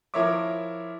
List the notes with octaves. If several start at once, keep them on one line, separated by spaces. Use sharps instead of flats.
F3 E4 A#4 C#5 E5 D6